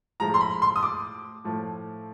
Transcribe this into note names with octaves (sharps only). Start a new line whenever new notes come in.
A2 F3 G#3 A#5
C6
B5
C6
D#6
D6
A2 F3 A3